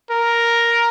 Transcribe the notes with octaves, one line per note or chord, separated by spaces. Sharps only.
A#4